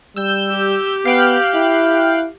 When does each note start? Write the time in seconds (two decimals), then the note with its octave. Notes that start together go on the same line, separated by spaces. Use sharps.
0.16 G3 E6 G6
0.51 G4
1.05 B3 F5 G5 F#6
1.54 E4